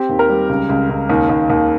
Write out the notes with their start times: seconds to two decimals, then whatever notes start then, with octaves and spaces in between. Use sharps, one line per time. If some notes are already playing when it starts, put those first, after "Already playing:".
Already playing: C4 G4
0.09 D#2
0.19 A#4
0.29 G3
0.49 C#2
0.69 C#2
0.90 C#2
1.10 D#2
1.29 D#2
1.50 D#2